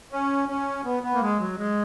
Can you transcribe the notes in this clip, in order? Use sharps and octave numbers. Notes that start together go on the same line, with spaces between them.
C#4
C#4
B3
B3
A#3
G#3
F#3
G#3